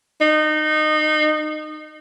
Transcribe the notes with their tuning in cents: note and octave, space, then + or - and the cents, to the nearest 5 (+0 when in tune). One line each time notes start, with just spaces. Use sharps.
D#4 -25